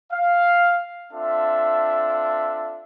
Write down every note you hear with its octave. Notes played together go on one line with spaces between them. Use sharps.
F5
C4 D4 F4 A4 E5